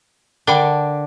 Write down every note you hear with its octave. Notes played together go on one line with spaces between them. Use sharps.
D3 D4 A#4 G5 B5